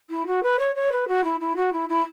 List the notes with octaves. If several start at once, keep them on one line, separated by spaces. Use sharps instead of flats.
E4
F#4
B4
C#5
C#5
B4
F#4
E4
E4
F#4
E4
E4